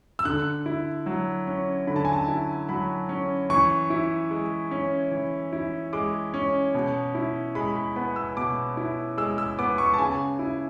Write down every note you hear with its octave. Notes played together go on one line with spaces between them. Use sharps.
E6
D3 F#6
E4
F#3
C#4
D3 B5
A5
G#5
A5
E4
F#3 B5
C#4
E3 C#6
E4
G#3
C#4
E3
E4
G#3 D6
C#4
B2
E4
G#3 B5
B5
B3 B5
E6
B2 D6
E4
G#3 E6
E6
B3 D6
C#6
A5
C#3 G#5
E4